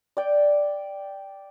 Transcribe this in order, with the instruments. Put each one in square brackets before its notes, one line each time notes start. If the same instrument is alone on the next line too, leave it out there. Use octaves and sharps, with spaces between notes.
[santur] D5 G5